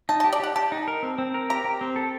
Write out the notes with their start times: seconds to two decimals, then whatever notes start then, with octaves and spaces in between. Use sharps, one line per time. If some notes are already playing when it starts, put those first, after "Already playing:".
0.09 D#4 A5
0.20 A5
0.24 G4
0.33 D5
0.40 G4 F#5
0.56 G4 A5
0.72 D#4
0.88 A#4
1.03 C4
1.18 C4
1.34 A#4
1.50 G4 A#5
1.65 G4
1.81 C4
1.96 A4